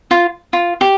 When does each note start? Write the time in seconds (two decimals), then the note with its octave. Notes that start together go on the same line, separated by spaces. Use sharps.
0.11 F4
0.53 F4
0.81 G4